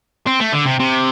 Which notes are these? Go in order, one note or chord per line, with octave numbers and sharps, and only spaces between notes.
C4
A3
D3
C3
C3